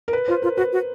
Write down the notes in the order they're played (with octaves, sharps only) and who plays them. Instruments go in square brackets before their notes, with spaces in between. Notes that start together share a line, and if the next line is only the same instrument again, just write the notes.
[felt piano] A#4
B4
[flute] F4 [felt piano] C5
[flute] F4 [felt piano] A#4
[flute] F#4 [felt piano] B4
[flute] F#4